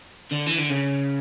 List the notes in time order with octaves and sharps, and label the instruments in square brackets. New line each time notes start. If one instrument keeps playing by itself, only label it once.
[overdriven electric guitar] D3
E3
D3
C#3